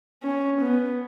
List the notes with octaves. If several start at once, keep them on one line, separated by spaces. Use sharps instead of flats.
C#4
B3